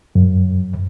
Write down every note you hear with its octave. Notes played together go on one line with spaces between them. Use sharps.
F#2